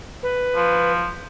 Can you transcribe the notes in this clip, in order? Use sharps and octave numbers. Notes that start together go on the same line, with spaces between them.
B4
F3